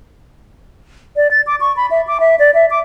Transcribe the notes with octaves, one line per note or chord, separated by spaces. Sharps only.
D5
A6
D6
C#6
B5
E5
D6
E5
D5
E5
D6